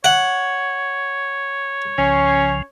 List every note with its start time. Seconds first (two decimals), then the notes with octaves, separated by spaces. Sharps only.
0.04 C#5 F#5
1.98 C2 C#3 F3 C#4